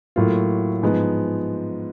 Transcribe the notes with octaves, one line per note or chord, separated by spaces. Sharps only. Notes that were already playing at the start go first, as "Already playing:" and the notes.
A2 F#3 A#3 F4
G#2 F3 G#3 B3